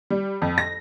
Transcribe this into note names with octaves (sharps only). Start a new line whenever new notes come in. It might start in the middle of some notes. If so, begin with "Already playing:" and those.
G3
F2
A#6